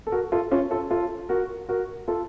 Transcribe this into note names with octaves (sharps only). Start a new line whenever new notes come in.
A4
F#4 A#4
F4 A4
C#4 F4
F4 A4
F4 A4
F#4 A#4
F#4 A#4
F4 A4